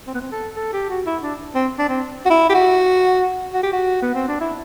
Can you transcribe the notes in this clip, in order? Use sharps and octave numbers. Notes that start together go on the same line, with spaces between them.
C4
B3
C4
A4
A4
G4
F#4
E4
D4
C4
D4
C4
F#4
E4
G4
F#4
F#4
G4
F#4
B3
C4
D4
E4